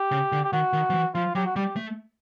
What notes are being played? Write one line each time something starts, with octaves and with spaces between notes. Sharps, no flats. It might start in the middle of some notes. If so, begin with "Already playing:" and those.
Already playing: G4
C#3
D3
G4
D#3 F#4
D#3
F3
E3
F3 F4
F#3 G4
F#4
G3 G4
A3